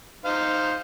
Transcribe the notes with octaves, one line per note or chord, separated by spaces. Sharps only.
D#4 C5 F5